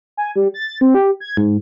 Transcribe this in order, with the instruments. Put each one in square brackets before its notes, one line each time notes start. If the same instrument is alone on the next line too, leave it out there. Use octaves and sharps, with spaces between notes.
[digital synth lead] G#5
G3
A6
C4
G4
G#6
G#2